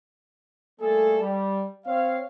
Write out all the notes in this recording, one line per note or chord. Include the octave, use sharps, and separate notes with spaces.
G3 A3 A#3 G#4 A4
G3
C4 C#5 F5